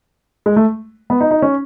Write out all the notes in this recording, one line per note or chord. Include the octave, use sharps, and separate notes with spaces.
G#3
A3
B3
D#4
D#4
C#4